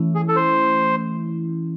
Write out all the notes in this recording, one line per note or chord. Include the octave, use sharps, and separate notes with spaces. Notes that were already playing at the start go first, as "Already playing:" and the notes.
Already playing: E3 A3 C#4 E4
G#4
A4
C5